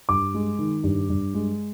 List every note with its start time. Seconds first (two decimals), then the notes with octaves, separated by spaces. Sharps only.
0.09 G2 D6
0.34 G#3
0.59 D#3
0.84 G2
1.10 G2
1.34 G#3